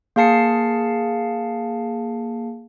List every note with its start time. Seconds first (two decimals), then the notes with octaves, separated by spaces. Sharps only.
0.16 A#3 G#4 F5 A5 C7 C#7